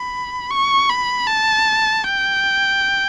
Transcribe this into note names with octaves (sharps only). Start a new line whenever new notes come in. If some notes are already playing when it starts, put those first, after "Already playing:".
Already playing: B5
C#6
B5
A5
G5